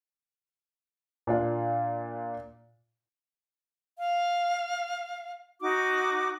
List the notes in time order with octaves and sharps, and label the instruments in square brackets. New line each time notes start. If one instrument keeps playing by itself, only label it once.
[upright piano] A#2 D4 F4
[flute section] F5
D#4 F#4 D6